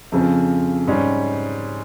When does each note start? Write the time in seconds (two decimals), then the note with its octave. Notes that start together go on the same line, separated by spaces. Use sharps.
0.12 F2 C#3 F3
0.87 G#2 G3 C#4